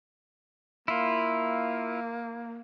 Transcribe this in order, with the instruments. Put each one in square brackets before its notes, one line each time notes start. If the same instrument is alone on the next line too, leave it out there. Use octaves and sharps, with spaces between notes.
[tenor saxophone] A#3 [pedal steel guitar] E4 F4